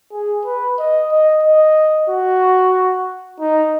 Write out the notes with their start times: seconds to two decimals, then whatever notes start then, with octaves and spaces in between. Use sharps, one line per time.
0.12 G#4
0.45 B4
0.79 D#5
1.12 D#5
1.43 D#5
2.10 F#4
3.40 D#4